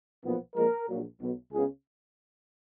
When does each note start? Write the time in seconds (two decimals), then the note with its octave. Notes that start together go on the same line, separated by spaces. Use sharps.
0.23 B1 A#2 F3 B3
0.55 A#1 A#2 F3 G#3 A#4
0.88 A#1 A#2 F#3
1.20 B1 B2 F#3
1.51 C#2 C#3 G#3 B3 G#4